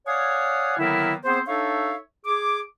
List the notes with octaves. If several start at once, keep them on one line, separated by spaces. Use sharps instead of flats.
C#5 D5 F5 F#5 G#5 D#6
D3 D#3 F#3 A#3 B3 E4
B3 C4 G#4 C5
D4 D#4 A4 C#5 E5 F5
G#4 D6